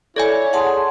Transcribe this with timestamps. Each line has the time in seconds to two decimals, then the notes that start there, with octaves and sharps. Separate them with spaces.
0.16 E4 A4 C#5 D5 G#5
0.53 G#4 F#5 A5 C6